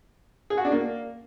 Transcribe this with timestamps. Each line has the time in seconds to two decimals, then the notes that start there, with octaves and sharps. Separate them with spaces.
0.50 G#4
0.58 F#4
0.65 D4
0.72 A#3